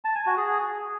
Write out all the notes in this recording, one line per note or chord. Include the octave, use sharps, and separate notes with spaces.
A5
G#5
F#4
G#4